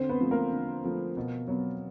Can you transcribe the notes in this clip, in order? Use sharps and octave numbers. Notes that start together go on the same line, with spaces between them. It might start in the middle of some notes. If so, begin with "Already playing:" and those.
Already playing: D3 C4 C5
B3 B4
F3 A3
A#3 A#4
D3
F3 A3
B2
F#3 B3